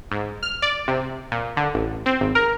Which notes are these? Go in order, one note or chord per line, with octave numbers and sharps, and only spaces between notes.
G#2
F6
D5
C3
A#2
D3
A1
C4
G#1
A#4